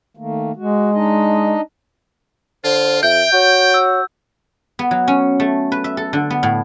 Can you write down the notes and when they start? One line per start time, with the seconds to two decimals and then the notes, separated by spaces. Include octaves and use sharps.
0.17 D#3 A3 A#3
0.56 G#3 F#4
0.93 D4 D#4 D#5
2.64 D3 F4 C5
3.03 F2 E5 G5 G6
3.33 F#4 C#5
3.74 E6
4.79 B3
4.91 F#3
5.08 C#4
5.40 A3
5.72 B4
5.84 E5
5.97 A4
6.13 D3
6.30 B3
6.43 A2